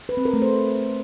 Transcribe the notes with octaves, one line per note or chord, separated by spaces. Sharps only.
B4
C4
A#4
A3
C5